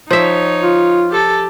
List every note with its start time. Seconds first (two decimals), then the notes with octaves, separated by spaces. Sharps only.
0.11 F3 D#4 C#5 E5
0.63 F4
1.10 G4 A4